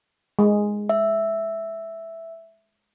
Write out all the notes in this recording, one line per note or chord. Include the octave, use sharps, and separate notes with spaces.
G#3
E5